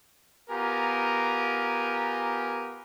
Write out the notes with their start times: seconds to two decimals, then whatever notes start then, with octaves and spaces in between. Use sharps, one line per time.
0.50 B3 F4 G4 A#4 G#5 A#5